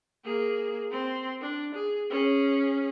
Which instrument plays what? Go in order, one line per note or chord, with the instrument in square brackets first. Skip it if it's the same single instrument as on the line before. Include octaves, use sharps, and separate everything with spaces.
[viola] A#3 G#4
C4 C6
D4
G#4
C#4 G#4